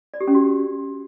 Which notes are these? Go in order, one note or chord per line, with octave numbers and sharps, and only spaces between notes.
D5
G4
C#4
F#4